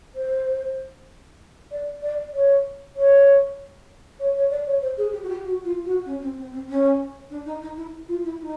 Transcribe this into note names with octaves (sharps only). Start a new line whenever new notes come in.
C5
D5
D5
C#5
C#5
C#5
C#5
D5
C#5
C5
G#4
G4
F#4
G4
F#4
F4
F#4
C#4
C4
C4
C4
C#4
D4
D#4
D#4
E4
F4
E4
D#4